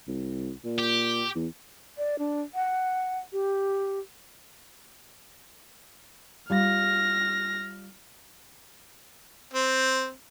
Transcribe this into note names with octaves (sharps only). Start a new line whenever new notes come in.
C2
A#2
G4
E2
D5
D4
F#5
G4
G3 F4 F6 A#6
C4